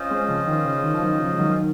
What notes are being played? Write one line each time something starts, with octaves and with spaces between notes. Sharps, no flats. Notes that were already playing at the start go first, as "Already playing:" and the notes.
Already playing: C#4 F4 C5 D#5
G#3 C4
C#3 F3
D#3
C#3
C#3
D#3
F3
D#3 F#3
C#3 F3
G#3
D#3 F#3